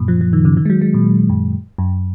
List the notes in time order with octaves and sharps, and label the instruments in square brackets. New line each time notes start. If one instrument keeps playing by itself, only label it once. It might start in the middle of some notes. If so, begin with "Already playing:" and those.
Already playing: [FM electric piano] F#2 A#2
F3
F3
D#3
C#3
D#3
G#3
F#3
G#3
A#2
F#2
F#2